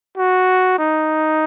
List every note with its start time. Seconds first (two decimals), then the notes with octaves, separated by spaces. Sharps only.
0.18 F#4
0.79 D#4